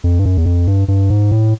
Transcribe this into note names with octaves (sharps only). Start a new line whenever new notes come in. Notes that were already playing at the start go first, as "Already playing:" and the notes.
F2
G2
F#2
E2
F2
G2
G2
G#2
A2